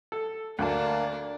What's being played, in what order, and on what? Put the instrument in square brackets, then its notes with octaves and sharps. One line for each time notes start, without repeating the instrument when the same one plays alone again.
[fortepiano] A4
[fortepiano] D2 A5 [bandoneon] A#3 [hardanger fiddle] D4